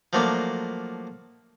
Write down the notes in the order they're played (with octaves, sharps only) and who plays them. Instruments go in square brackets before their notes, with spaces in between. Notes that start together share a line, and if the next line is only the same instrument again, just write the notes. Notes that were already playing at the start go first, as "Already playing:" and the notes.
[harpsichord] F3 F#3 A3 A#3 D4